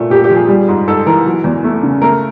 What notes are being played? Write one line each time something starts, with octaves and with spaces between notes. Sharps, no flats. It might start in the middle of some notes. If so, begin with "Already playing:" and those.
Already playing: A#2 A3
A#2 G4
G4
F3
G#4
G3
G#2
G#2 A4
E3 A#4
F#3
E2
A3
C#3
A3 A#4